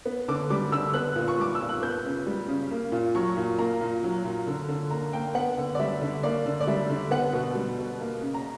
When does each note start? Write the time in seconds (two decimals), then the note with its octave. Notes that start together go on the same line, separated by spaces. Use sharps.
0.05 B3
0.28 D3 D6
0.50 G3 D6
0.71 D3 E6
0.94 B3 F#6
1.16 A#2
1.28 C#6
1.38 G3 D6
1.55 E6
1.61 A#2
1.69 F#6
1.82 B3 G6
2.05 C#3
2.27 G3
2.48 C#3
2.71 A#3
2.92 A#2
3.15 F#3 C#6
3.37 A#2
3.59 A#3 A#5
3.81 A#2
4.03 F#3
4.25 A#2
4.47 D3
4.68 D3
4.91 A#3 A#5
5.13 A#3 G5
5.35 B3 F#5
5.58 D3
5.75 D5
5.79 G3 E5
6.01 D3
6.23 A#3 D5
6.46 D3
6.61 D5
6.67 G3 E5
6.90 D3
7.11 B3 F#5
7.33 B2
7.55 G3
7.78 B2
8.00 A#3
8.21 C#3
8.34 A#5